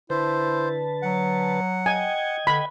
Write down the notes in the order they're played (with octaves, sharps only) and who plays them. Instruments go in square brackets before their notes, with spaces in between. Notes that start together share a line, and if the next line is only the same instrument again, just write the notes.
[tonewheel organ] D3 B4 A5 [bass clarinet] E4 [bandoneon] C5
[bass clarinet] F#3 [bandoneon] F#5
[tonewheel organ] D#5 G5 G#6 [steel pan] G#5
[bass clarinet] D3 [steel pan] B5